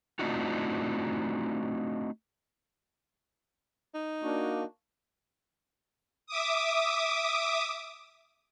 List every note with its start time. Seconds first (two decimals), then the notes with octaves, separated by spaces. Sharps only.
0.19 A3 C4 D4 D#4 F4 F#4
3.95 D#4
4.23 A#3 D4 F#4
6.27 E5 D6 D#6